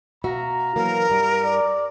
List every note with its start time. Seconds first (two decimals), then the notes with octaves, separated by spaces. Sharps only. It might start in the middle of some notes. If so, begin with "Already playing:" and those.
0.24 B2 F#4 E5 F5 A#5
0.76 E3 F#3 A#3 A#4
1.10 G2 G3
1.45 D5